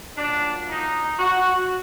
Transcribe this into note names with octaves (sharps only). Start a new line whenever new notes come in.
A#2 F#3 D4
D#4
F#4